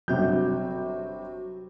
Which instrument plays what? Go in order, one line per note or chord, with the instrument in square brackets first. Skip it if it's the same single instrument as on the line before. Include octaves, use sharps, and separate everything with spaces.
[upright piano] G1 C3 G6 [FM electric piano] F#3 F#4